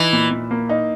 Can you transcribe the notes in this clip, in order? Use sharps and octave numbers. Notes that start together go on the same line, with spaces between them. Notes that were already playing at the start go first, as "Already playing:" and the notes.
Already playing: E3 D#4
A#2
A#2
A#3
D#4